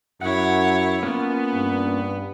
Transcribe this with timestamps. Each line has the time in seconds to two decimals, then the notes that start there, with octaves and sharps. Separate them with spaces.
0.21 F#2 E4 C#5 F#5
1.03 A#3 B3 C#4 F4
1.54 G2